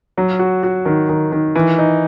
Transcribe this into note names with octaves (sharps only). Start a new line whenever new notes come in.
F#3
F#4
F#4
D#3
D#3
D#3
E3
D#4